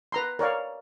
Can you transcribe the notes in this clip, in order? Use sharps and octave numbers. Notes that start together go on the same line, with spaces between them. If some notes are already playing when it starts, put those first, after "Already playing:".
B4 A#5 C6
A#4 C#5 D5 F5